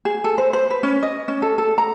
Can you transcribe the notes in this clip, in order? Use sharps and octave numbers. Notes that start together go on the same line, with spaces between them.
G#4
A4
C5
C5
B4
C#4
D#5
C#4
A4
A4
A#5